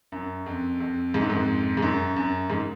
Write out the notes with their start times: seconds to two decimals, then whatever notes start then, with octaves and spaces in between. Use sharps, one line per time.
0.12 F#2
0.46 F2
0.80 F2
1.14 G#2
1.21 F#2
1.29 F2 G#2
1.77 G#2
1.82 F#2
2.16 F#2
2.50 G#2